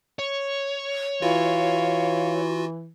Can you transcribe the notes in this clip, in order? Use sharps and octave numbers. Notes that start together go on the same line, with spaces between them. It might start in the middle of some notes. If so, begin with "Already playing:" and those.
C#5
E3 F4 F#4 F5